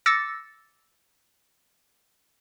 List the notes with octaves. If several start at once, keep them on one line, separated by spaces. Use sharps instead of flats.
D6 E6 A6 A#6 C#7